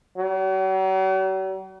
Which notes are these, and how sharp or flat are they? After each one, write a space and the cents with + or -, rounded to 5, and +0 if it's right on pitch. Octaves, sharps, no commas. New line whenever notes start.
F#3 +45